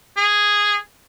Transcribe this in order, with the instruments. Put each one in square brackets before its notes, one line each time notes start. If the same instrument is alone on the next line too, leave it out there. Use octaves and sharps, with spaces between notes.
[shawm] G#4